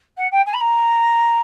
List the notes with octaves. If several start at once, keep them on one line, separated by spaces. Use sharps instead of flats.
F#5
G5
G#5
B5
A#5